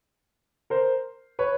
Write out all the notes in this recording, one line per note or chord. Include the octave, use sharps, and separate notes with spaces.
A#4 C5
B4 C#5